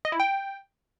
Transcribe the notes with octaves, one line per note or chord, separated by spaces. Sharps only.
D#5
E4
G5